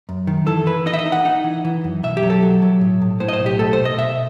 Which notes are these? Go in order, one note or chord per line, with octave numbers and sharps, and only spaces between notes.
F#2
D#3
E3 A4
E3 B4
D#4 D#5
E5
D#5
D#4
F#5
D#4 F#5
E3
E3
F#2
B1 E5
G4
F#3
A4
F#3
F#3
A2
A2
A2 C5
D#5
C5
B1
G4
A3 A4
C5
B2
D#5
B2 E5